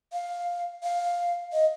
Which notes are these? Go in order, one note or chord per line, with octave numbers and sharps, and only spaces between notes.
F5
F5
D#5